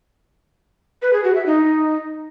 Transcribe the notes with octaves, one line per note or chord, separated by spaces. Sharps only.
B4
G#4
F#4
E5
D#4